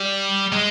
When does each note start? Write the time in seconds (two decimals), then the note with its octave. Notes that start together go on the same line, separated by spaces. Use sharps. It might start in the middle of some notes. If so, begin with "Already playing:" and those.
Already playing: G3
0.52 G#3